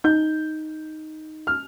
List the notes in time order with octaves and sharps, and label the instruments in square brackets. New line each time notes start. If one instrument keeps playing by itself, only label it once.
[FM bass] D#4 [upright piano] G6
[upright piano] F6